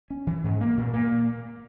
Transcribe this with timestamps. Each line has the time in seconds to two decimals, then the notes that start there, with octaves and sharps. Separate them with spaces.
0.10 C#4
0.27 E3
0.44 G#2
0.61 A#3
0.77 A#2
0.93 A#3